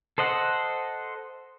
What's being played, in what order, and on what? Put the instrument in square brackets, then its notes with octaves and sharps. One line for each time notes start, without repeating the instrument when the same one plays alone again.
[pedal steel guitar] A4 C5 D#5 F#5